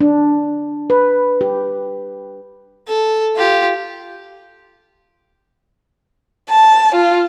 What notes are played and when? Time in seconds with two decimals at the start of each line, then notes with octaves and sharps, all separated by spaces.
0.01 D4
0.90 B4
1.41 G4
2.87 A4
3.36 F4 G4
6.49 A5
6.95 F4